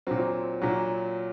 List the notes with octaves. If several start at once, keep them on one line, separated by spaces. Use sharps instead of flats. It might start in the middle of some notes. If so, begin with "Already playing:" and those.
A#2 F#3 C4
A#2 F#3